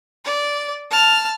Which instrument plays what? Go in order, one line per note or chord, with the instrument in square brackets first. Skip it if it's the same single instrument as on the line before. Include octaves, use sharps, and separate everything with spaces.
[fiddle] D5
A5 F6